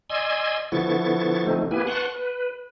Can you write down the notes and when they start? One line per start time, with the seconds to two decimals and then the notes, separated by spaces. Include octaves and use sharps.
0.10 D5 D#5 G#5 C6 E6 G#6
0.72 D3 F3 B3 E4 C#6 A6
1.47 D3 F3 A3 C4 D#4
1.71 A#3 B3 E4 G4 B4 G#5
1.87 B4 F#5 A5 C6 C#6 F#6
2.15 B4